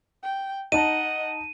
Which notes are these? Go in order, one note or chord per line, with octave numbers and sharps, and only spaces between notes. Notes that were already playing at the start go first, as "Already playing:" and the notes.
G5
D#4 D#5 F#5 A5 D#7